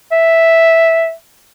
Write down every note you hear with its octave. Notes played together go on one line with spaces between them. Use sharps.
E5